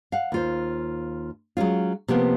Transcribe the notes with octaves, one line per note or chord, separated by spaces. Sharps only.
F5 F#5
D#2 F4 C5
F#3 G#3 C#4 F4
C3 F3 A#3 B3